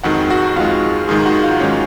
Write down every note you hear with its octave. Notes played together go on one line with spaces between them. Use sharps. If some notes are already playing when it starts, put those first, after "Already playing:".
F2 D#3 G#3 F#4 F#5
F#4 F#5
F2 D#3 G#3 F4 F5
G#2 D#3 G#3 G#4 G#5
F#4 F#5
F4 F5
G#2 D#3 G#3 C#4 C#5